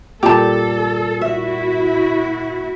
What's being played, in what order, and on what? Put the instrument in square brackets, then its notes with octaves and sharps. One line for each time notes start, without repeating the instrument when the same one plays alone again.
[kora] A#2 G3 [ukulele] G4 A5 [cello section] A4
[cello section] E4 F#4 [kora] E5